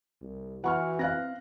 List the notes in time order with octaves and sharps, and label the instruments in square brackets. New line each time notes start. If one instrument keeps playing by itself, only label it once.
[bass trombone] C2
[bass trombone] E3 [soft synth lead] F#4 [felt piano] F#5 C#6 F6
[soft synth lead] C4 [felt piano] F5 F#6 A#6